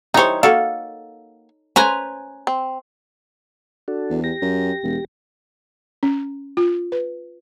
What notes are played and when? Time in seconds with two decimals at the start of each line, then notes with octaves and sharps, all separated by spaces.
0.14 E3 G3 D#4 C5 C#5
0.43 A#3 F#4 A4 F5
1.76 C#4 B4 C5 G#5 A#5
2.47 C4
3.88 D4 F#4 A4
4.10 E2
4.24 G4 A#6
4.42 F#2
4.83 E1
6.03 C#4
6.57 F4
6.92 B4